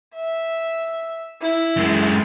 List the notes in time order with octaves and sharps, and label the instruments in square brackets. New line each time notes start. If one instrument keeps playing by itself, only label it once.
[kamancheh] E5
E4
[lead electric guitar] F#2 G#3